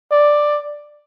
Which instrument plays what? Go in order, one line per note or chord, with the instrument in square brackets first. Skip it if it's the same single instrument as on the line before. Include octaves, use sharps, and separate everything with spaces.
[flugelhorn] D5